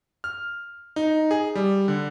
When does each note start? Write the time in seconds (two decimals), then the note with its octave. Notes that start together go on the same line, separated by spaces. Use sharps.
0.24 F6
0.96 D#4
1.31 G#4
1.55 G3
1.88 D3